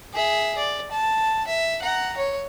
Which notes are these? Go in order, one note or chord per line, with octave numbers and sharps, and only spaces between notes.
G#4 E5
D5
A5
E5
F#5 A#5
C#5